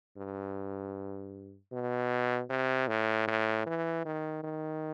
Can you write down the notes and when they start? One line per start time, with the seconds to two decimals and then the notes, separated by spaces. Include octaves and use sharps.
0.17 G2
1.72 B2
2.50 C3
2.88 A2
3.28 A2
3.66 E3
4.05 D#3
4.43 D#3